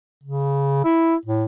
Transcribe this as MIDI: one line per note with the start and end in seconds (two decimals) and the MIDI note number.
0.23 0.83 49
0.85 1.15 64
1.26 1.45 45